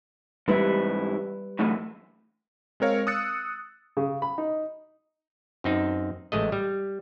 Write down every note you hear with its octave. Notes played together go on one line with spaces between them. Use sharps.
G#2 E3 G3 E4 B4
F#2 A2 E3
G#3 C4 A#4 C#5 F5
D#6 E6 F#6 A6 C#7
C#3
B5
D#4
F#2 C4 D#4
A1 G#3 A3 D#5
G3